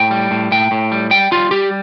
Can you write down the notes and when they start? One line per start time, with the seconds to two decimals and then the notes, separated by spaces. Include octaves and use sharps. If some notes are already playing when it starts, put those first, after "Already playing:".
Already playing: A2 G5
0.11 G3
0.31 A2
0.52 A2 G5
0.71 A2
0.92 G3
1.11 G3 G5
1.31 G3 F4
1.51 G3 G4